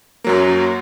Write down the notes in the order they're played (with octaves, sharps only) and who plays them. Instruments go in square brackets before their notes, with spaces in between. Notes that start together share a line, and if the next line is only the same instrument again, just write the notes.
[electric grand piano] F#2 F#3 A#3